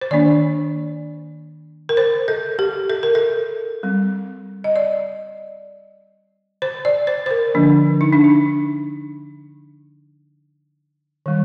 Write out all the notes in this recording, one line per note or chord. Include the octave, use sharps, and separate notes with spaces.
C5
D#3 A#3 D4 D5
A#4
C5
A4
G4
A4
A#4
A4
G3 C4
D#5
D5
C5
D5
C5
C5
A#4
D3 F3 A#3 D4
D#4
D4
D#4
D#3 G3